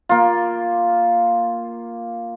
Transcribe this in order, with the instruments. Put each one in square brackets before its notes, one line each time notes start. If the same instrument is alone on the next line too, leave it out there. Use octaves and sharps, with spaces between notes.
[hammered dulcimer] A#3 F4